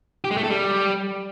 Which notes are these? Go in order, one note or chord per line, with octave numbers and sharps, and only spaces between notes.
G4
G#3
A3
A4
G3